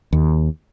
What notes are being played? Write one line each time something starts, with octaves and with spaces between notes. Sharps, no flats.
D#2